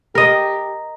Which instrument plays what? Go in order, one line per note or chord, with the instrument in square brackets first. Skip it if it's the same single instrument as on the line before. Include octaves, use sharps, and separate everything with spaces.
[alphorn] G4 [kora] A#4 D#5